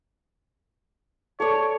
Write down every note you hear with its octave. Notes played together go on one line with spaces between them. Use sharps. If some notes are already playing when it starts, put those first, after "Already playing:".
A4 C#5 D5